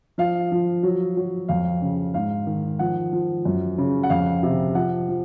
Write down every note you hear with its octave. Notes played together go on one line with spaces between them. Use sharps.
F3 F5
F3
F#3
F#3
F2 F5
C#3
G#2 F5
D#3
F3 F#5
F3
F#2
C#3
F#5
F2 F5
C3
F3 F#5
F3